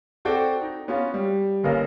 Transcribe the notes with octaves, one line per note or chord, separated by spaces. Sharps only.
C4 F#4 A4 C5 D5 G5
D#4
B3 C#4 F4 F#4
G3
G1 A#3 C#4 A#4 D#5